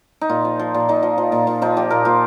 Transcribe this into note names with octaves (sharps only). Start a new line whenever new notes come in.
D#4
A#2 F4
F3
F3
A#2
A#2 D#4
F3
F3
A#2
A#2
F3 D#4
F3 G4
A#2 A#4
A#2 F4